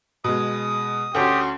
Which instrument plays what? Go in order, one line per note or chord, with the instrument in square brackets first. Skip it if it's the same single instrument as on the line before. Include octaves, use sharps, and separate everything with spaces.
[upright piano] B2 G#3 [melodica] D#6
[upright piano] D2 C#4 [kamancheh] F#4 C6 [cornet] G4